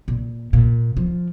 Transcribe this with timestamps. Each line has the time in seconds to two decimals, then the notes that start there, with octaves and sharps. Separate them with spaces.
0.08 A#2
0.53 A#2
0.97 F3